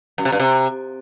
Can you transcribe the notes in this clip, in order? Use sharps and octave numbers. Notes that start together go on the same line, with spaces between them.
F#2
C3
G2
C3